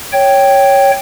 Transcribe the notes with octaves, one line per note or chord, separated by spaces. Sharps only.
C#5 G5